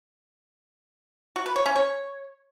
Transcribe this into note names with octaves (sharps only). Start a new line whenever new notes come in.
F#4
B4
C#5
C#4
C#5